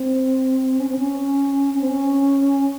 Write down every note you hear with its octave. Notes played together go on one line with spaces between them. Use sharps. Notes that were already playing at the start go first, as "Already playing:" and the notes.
Already playing: C4
C#4
C4
C#4
C#4
C4
C#4